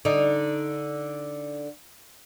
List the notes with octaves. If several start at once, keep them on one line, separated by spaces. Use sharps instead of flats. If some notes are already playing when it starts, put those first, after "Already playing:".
D3 D#4